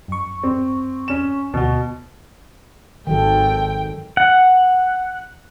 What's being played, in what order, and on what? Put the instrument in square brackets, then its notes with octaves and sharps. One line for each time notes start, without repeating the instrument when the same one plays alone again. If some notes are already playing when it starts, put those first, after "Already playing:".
[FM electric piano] F#2 C#6
[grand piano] C4
C#4 E7
[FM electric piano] D2 F#4 [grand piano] B2
[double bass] G#1 [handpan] D#3 F#3 A4 [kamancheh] G5
[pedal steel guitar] F#5